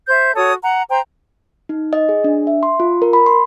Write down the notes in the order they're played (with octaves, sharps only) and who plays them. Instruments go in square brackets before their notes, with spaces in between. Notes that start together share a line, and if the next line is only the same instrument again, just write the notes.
[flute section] C5 E5 G6
F#4 A4 C#5 D#6
F#5 A#5
C5 G5 A#5
[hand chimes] D#4
D#5
G#4
D4
E5
C6
F4
A#4
B5
C6